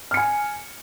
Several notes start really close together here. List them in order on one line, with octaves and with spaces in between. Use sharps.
F6 C#7 G#5